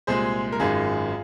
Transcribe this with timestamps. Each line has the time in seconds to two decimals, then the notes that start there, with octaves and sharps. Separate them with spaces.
0.07 C2 A#2 G#3 G#4 C5
0.52 A#4
0.60 G#1 F#2 D#3 G#3 F4 G#4